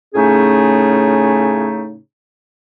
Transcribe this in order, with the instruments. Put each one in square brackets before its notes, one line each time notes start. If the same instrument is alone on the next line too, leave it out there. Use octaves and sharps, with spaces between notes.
[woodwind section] A2 C#3 A3 C#4 D#4 G#4